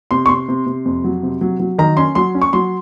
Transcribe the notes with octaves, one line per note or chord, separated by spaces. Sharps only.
C3 C6
C#6
C3 C6
C3
C3
F2
F#3
C3
F#3
F#3
D#3 A#5
C#4 C6
F#3 C6
C#4
C#6
F#3 C6